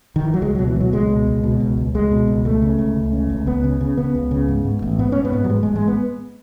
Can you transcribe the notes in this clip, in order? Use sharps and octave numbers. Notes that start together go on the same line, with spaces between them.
D#3
E3
F#3
C#2 G#3
B2 F#3
E3
B2 F#3
C#2 G#3
B2
C#2
B2
C#2
C#2
C#2 G#3
B2
C#2
C#2 A3
C#3
C#2
C#2
C#3
C#2
C#2 B3
C#3
C#3
C#3 B3
C#2
C#3
G#2
G#2
A1
G#2 B3
G#2 C#4
B3
G#2
F#3
G#2 G#3
G#3
A1
G#3
B3